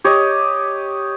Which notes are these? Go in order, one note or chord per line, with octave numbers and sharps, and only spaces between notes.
G4 C#5 D#5